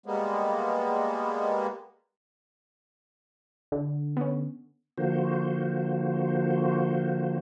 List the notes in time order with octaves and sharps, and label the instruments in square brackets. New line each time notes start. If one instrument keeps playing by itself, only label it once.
[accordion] G3 G#3 A#3 B3
[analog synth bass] D3
[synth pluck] B3 C#4
[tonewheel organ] D3 F3 A#3 F#4 C5